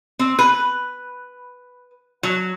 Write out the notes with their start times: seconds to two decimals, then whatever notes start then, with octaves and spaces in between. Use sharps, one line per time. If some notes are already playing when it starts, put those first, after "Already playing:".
0.19 C4
0.39 B4
2.23 F#3